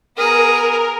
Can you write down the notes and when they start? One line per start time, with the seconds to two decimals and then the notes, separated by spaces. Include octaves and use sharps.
0.17 B3 G#4 A#4